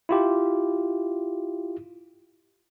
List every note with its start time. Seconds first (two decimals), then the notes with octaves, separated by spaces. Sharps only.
0.09 E4 F4 G4